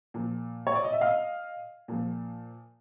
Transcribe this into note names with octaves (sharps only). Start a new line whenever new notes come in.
A#2 F3
C#5
D5
D#5
E5
D#5 F5
A#2 F3